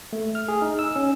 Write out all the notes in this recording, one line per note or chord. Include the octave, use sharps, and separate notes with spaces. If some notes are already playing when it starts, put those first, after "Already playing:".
A3
F6
G#4
D#4
E6
C#4